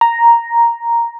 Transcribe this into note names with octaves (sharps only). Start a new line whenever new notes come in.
A#5